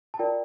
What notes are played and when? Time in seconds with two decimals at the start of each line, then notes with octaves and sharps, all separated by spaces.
0.14 A5
0.19 F4 A#4 D5 G5